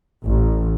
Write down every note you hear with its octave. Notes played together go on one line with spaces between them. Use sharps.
A1